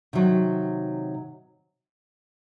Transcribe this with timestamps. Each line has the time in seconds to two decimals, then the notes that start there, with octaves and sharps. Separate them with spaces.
0.13 C3 D#3 F#3